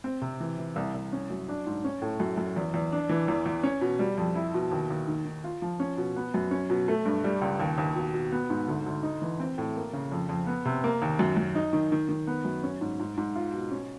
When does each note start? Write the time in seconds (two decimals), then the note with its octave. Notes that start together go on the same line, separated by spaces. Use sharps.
0.04 C4
0.21 C3
0.40 E3
0.58 E3
0.76 C2
0.94 C2
1.13 C#4
1.30 F#2
1.49 D4
1.67 G#2
1.85 C#4
2.02 A2
2.20 F#2
2.38 F#2
2.56 E2
2.74 E2
2.92 D4
3.09 E3
3.28 E2
3.46 E2
3.63 C#4
3.81 B2
3.99 G3
4.18 F2
4.35 E4
4.54 B2
4.71 D#2
4.90 D#2
5.08 D#3
5.25 D#3
5.44 F4
5.62 F3
5.80 C#4
5.97 B2
6.16 B3
6.34 F#2
6.51 C#4
6.70 B2
6.88 A3
7.05 G2
7.24 G3
7.42 C#2
7.60 D#2
7.78 D#2
7.95 B2
8.14 B2
8.32 B3
8.50 G#2
8.68 D2
8.86 D2
9.03 D#4
9.22 E3
9.40 C4
9.58 A2
9.76 A#3
9.93 C#3
10.12 F2
10.29 F2
10.47 B3
10.65 C3
10.84 A#3
11.02 D#2
11.19 F#2
11.37 F#2
11.55 D#4
11.73 D#3
11.92 D#3
12.09 D#3
12.27 B3
12.45 F#2
12.63 C#4
12.81 G#2
13.00 G#2
13.17 G#2
13.36 F4
13.53 B2
13.71 C#4